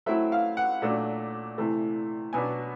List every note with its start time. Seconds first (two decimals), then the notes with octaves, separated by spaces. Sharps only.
0.06 F#3 A3 C4 E4 E5
0.32 F5
0.57 F#5
0.82 A#2 F#3 A3 D4
1.58 C3 E3 A3
2.33 B2 F#3 B3 D4 G#5